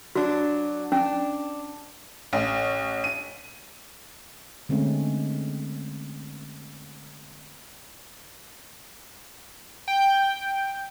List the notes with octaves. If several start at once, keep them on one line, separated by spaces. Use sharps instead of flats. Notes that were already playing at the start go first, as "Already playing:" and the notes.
F#3 D4 F#4
C#4 D4
A1
D#7
D3 G#3 A3 C4 C#4
G5